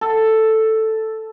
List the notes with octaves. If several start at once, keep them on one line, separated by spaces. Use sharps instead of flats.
A4